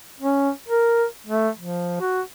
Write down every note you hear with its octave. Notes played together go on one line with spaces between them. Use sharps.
C#4
A#4
A3
F3
F#4